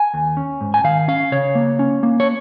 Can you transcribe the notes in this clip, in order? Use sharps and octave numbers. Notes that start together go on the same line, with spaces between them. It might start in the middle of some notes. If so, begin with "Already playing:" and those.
Already playing: G#5
D#2
C#4
G#2
G#5
D#3 F5
C#4 F5
C#3 C#5
A#3
C#4
A#3
C#5